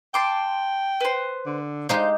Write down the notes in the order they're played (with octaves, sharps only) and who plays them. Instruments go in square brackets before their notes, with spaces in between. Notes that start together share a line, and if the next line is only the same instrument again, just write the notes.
[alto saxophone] G5 [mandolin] A5 C6 D6
[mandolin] B4 C5
[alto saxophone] D3
[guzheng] G#3 D#4 G4 [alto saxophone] C5 [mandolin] F5 G6